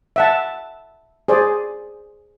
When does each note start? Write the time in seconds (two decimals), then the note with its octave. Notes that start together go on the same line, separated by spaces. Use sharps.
0.16 E5 F#5 A5
1.28 G#4 C5 D5